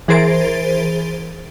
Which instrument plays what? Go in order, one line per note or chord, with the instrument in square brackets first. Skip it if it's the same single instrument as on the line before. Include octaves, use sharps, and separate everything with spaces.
[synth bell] E3 G#4 A#4 C5 A6 D7